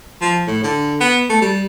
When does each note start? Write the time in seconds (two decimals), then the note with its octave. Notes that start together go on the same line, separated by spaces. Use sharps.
0.22 F3
0.48 A2
0.64 D3
1.01 B3
1.30 A3
1.42 G3